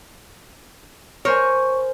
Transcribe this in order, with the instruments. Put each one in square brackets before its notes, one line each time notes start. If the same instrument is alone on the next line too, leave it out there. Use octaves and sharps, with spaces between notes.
[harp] A#4 C5 G#5 [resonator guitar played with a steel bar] C#5